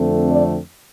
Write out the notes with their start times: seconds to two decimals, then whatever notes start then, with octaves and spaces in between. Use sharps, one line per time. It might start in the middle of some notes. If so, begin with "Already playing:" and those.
Already playing: F2 D3 A3 C4
0.31 D5